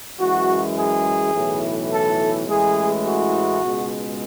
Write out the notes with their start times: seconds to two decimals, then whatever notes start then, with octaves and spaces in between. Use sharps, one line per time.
0.19 F#2 E3 G#3 F#4
0.77 G#4
1.33 B1 A2 E3
1.91 A4
2.47 A1 A2 E3 G#3 G#4
3.05 F#4
3.62 C#2 B2 G#3